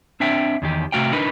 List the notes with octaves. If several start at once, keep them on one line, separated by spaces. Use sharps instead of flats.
C4 D4 E5 F#5 G5
E2 D#3 G4
C3 A3 F#4 F5 G5
D4 D#4 A#4 B4